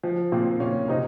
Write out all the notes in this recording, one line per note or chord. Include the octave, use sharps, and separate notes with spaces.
F3
A#2 C4
A#2 C#4
C3 D#4